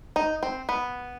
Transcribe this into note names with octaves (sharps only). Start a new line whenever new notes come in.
D#4
C4
B3